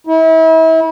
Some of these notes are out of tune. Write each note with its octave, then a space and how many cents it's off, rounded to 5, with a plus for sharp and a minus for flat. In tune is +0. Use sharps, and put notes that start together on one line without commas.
E4 -35